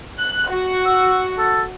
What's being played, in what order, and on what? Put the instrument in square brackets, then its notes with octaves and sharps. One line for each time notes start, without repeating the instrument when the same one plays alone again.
[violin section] F#6
F#4
[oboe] E6
A4